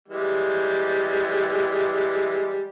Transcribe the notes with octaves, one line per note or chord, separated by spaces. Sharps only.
E3 G3 G#3